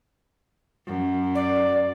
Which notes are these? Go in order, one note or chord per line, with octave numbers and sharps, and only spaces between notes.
F#2
D5